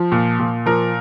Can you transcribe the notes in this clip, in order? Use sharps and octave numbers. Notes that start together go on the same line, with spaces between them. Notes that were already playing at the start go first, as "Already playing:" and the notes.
Already playing: F3
A#2
A#2
F3 A#4